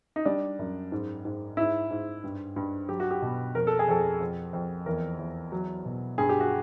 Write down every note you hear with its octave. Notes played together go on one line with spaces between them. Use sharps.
D#4
G3 D4
F#2
G#2
G#2
G#2 E4
G#2
G2
G2
F#3 G4
F#4
G4
B2
F2 A#4
A4
G#4
F2 A4
F2
F2
E2 A#4
E2
F#3
B2
G2 G#4
G4
F#4